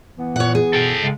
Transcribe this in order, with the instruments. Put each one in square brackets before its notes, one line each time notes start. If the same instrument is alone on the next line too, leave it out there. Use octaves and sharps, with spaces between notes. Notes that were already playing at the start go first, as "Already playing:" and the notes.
[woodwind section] E3 B3
[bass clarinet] A#2 [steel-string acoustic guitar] C#5 F#5
[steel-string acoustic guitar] G#4
[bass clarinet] B2 [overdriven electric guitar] A4 G5
[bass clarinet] C#3 [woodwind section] G#3